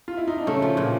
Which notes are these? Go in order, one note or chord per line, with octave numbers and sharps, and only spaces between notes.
F4
E4
D#4
D4
C#3 A3 C#4
F3
A#2